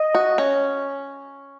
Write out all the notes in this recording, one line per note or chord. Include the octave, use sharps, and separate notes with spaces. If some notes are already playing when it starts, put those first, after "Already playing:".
Already playing: D#5
F#4
C#4